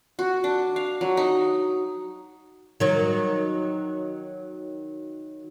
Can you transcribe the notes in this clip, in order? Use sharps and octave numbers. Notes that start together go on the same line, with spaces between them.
F#4
D4
F5
F#3
D#4
D#3 F#3